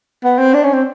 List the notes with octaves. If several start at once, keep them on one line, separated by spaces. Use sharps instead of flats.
B3
C4
D4
C#4
C4